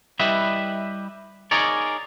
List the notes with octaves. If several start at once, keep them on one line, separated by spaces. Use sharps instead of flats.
G3 E4 G4 B4 D#5 E5
D#4 G#4 A#4 C#5 D5